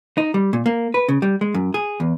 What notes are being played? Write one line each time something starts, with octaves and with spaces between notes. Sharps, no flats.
D#4
G3
A#2
A#3
B4
C#3
G3
G#3
F#2
G#4
E2